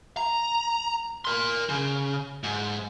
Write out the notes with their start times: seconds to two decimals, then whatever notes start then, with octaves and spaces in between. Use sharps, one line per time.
0.17 A#5
1.25 A#4 C6
1.69 C#3
2.44 G#2